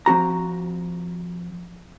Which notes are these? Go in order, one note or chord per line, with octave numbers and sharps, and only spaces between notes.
F3 C4 F#4 A#5